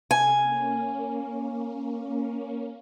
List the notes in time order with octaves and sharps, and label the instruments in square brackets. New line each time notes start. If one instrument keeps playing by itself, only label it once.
[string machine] C3 A4 F5 [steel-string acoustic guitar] G#5
[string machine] A#3 C#4